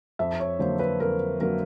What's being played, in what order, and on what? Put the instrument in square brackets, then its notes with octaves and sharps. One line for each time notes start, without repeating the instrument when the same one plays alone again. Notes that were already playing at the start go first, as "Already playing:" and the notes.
[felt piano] F2 E5
C#5
D3 F#3 A#3 C5
B4
F2 A#4
D3 F#3 A#3 A#4